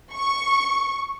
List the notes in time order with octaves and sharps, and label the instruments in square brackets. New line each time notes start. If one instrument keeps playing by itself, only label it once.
[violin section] C#6